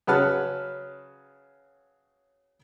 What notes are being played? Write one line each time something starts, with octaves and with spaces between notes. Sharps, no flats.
C#3 F#3 B4 F#5 A5 F6